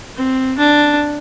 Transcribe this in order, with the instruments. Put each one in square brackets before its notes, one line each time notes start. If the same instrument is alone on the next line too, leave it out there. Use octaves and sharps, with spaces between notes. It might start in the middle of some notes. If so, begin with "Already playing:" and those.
[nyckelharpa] C4
D4